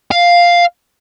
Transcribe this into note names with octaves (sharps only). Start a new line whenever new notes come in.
F5